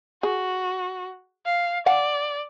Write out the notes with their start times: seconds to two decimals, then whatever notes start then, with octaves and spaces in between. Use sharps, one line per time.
0.23 F#4 G#4
1.46 F5
1.86 D5 F5 F#5 G#5